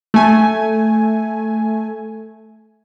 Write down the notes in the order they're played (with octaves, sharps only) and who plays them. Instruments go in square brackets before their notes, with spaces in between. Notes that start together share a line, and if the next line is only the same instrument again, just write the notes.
[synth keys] A3 G#5